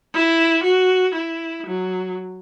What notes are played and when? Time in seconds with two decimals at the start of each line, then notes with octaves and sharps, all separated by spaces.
0.14 E4
0.64 F#4
1.15 E4
1.66 F#3